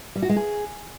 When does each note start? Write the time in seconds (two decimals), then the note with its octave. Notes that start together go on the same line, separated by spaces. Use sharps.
0.15 G3
0.22 F#4
0.29 G#3
0.36 G#4